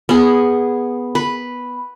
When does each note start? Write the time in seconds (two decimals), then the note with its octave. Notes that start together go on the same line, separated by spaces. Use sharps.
0.09 B3 G#4
1.15 B4